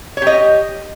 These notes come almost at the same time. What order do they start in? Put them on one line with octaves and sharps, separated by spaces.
C#5 G4 D#5